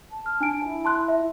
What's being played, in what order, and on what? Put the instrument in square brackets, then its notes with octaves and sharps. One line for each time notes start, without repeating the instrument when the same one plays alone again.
[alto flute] A5
[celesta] F6
D4 G#5 D7
[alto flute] E4
[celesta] A5 C6 F#6
E5